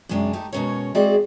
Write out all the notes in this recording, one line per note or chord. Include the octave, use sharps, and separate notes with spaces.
F#2 C3 G#3 C#4 D4
A3 D#4 G4
B2 G#3 C#4 A#4 C#5
G#3 C4 E4 F#4 G#4 D5